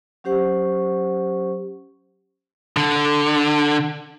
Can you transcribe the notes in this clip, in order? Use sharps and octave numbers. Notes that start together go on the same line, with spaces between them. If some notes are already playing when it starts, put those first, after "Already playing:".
F#3 C#4 G4 C5 F#5 C#6
D3